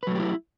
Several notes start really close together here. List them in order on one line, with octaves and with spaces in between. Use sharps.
B4 F#3 A3 G4 E4